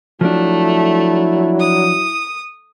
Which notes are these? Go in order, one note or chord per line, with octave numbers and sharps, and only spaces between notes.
F3 F#3 A3 D4 E4
D#6